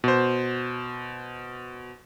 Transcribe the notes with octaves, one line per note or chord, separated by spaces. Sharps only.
B2 C5